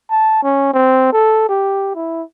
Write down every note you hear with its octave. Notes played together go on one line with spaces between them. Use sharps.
A5
C#4
C4
A4
G4
E4